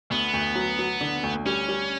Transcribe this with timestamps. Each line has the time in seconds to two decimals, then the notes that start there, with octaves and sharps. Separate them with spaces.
0.10 D2 B3
0.33 D2
0.55 F#3
0.79 F#3
1.01 D3
1.23 D2
1.46 G3 C#4
1.69 G3